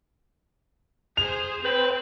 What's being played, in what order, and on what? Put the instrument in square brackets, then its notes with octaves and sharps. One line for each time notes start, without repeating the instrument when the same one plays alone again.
[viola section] G#4 C5 [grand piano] F7
[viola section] C4 [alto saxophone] B4 [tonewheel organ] C5 G5